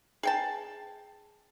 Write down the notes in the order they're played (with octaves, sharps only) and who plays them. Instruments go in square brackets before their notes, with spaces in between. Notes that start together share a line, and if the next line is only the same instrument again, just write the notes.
[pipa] G#4 G5 A5